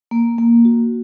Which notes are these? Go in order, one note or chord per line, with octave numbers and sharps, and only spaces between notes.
A#3
A#3
F#4